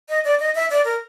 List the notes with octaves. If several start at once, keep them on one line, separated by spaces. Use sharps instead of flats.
D#5
D5
D#5
E5
D5
A#4